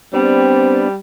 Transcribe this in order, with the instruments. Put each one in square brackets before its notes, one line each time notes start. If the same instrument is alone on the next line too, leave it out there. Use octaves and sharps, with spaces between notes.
[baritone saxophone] G3 [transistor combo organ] B3 D4 [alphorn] C4